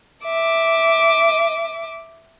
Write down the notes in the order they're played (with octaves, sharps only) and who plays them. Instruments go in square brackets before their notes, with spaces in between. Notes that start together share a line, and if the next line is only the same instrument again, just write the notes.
[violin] E5 D6